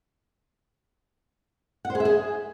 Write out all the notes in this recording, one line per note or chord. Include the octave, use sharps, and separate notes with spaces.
F#5
C5
G#4
E5
G#4